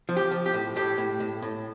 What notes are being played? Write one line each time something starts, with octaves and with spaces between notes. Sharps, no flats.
F3
G4
F3
G4
A2
A2 G4
A2
A2
A2